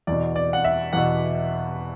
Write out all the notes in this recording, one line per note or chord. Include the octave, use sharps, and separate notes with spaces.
E2 B2 D5
D5
F#5
E5
E2 B2 F#5